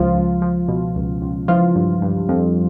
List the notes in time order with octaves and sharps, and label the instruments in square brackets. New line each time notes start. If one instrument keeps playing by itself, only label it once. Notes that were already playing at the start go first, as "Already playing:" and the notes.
Already playing: [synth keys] C#2 F3 F4
C#2
F3
B2
C#2
C#2
E3 F3 F4
G2
G2
F2